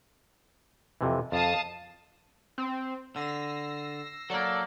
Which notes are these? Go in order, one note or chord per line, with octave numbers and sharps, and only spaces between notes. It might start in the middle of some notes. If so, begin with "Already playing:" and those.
F2 C3 E3
F2 F5 A5 D#6
C4
D3 E6 A#6 C7
F#3 A#3 A4 D5